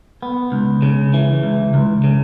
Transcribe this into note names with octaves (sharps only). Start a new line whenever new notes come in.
B3
C#2
C#3
E3
C#2
C#2
C#3